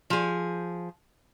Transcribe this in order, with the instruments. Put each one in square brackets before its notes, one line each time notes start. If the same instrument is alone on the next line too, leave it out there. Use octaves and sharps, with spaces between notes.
[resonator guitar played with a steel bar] F3 G#4